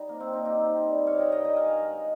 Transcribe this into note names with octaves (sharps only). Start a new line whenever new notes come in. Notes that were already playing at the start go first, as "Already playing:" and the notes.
Already playing: G3 D#4
C3 A#3
C4
C3 C4 D#4
D#4 G4
D#3
G3
G2 C#5 F5
D#5 G5
G2 D#5 G5
D#5 G5
D#3 F5 G#5
G#3